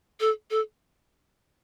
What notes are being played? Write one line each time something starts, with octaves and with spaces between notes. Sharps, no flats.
A4
A4